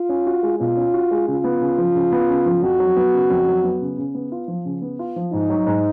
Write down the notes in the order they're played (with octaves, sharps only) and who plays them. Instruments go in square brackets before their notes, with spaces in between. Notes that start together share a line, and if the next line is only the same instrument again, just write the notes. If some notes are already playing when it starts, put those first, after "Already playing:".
Already playing: [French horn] F4
[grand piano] C#4
F#4
G#3
[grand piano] B2 [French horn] F4
[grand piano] C#4
F#4
G#3
[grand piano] C#3 [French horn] F4
[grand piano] B3
C#3
F3
C#3
B3
C#3
F3
[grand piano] F2 [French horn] F#4
[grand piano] F#3
B3
C#3
F2
F#3
B3
C#3
C#3
B3
F4
F3
C#3
B3
F4
F3
[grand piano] G#2 [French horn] D#4
[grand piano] F#3
G#2